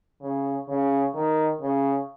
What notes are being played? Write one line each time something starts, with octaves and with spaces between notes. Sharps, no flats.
C#3
C#3
D#3
C#3